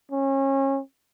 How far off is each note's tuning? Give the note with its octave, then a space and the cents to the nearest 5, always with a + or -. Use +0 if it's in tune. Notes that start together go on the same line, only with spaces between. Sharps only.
C#4 -30